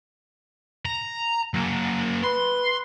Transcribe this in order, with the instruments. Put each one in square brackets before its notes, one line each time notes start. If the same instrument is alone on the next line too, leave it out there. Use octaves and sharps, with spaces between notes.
[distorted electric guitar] A#5
F#3 A#3
[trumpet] B4 [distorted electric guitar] C6